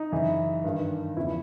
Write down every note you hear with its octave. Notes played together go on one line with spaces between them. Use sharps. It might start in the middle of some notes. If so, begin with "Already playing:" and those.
Already playing: D#4
F#2 C#3 E3
G2 D#3
E2 C#3 F3 E4